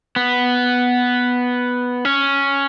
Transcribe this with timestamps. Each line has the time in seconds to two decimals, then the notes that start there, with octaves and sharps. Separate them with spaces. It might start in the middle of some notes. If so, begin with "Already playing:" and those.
0.16 B3
2.05 C#4